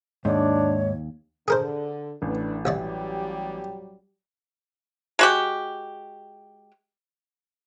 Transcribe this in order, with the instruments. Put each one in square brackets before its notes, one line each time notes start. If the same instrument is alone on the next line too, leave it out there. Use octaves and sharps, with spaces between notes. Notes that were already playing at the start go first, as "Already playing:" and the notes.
[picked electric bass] D#2 [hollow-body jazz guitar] G#2 [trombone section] D4 [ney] C#5
[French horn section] D3 [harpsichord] G#4 A#4 C5
[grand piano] A1 A2 [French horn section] D4 B4
[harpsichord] C2 C#5 D5 [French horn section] F#3 G3 G4
[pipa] G#3 F#4 G4